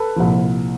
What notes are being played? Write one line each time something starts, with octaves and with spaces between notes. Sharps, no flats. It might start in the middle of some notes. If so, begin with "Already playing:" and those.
Already playing: A4 B4
C2 A#2 F3